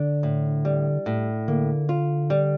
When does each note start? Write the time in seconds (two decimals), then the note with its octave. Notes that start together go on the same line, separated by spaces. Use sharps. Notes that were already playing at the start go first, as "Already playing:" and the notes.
Already playing: D3 D4
0.23 A2
0.65 G3
1.06 A2
1.48 D3 A#3
1.89 F4
2.30 G3